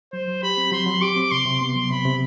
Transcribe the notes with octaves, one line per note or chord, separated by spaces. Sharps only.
F#3 C5
F#3
G4 B5
C4
F#3 C6
F#3
G4 D6
C4
C3 C6
C3
B3 C6
F#3
C3 B5
C3